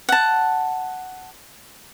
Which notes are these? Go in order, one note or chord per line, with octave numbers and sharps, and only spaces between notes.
F#5 A5